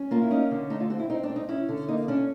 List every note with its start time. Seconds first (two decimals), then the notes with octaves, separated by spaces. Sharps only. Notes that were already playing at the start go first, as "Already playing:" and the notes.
Already playing: C#4
0.11 A#3 F4
0.22 E4
0.31 C#4 D#4
0.51 D3
0.70 A3 D#4
0.80 F4
0.90 C4 F#4
1.00 E4
1.10 C4 D#4
1.23 D4
1.29 C4
1.36 D#4
1.49 C#4 E4
1.69 D3
1.88 A#3 D#4
2.08 C#4 D4